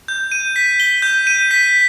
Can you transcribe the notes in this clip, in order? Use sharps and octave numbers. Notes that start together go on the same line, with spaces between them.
G6
D#7
B6
G7
G6
D#7
B6